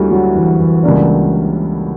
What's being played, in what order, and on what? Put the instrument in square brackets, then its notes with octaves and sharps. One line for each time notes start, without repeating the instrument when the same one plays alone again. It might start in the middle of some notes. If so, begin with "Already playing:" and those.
Already playing: [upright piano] D2 D3 A#3 [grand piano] G3 E4 F#4
[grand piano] F#3
E3
E3
[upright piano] C#2 C#3 G3 A#3 D4